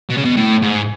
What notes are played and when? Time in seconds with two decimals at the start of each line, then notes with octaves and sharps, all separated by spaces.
0.10 B2
0.18 C#3
0.25 B2
0.37 A2
0.62 G#2